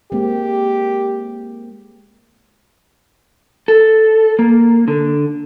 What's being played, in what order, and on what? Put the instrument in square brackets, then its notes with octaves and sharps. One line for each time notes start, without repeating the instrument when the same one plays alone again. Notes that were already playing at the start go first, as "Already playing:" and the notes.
[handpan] G#3 A#3 C4 [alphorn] G4
[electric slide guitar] A4
A#3
D3